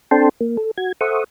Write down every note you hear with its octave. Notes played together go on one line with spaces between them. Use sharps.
C4 D4 A4 G5 A5 C6
A#3
A4
F#4 G#6
A4 C5 E5 F#5 C#6 D#6